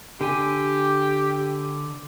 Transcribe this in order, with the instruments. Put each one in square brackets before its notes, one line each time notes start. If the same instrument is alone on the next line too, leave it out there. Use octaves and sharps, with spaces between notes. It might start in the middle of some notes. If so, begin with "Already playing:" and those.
[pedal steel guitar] D3 G#5 [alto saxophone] G4